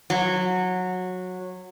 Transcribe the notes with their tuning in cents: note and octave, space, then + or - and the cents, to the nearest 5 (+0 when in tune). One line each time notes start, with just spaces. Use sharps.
F#3 -15